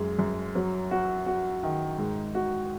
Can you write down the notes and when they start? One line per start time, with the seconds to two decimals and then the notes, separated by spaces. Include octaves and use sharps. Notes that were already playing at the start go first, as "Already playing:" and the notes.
Already playing: F#2 G#3
0.19 F#2
0.55 F#3
0.91 F#4
1.26 F#4
1.63 D#3
1.98 G#2
2.35 F#4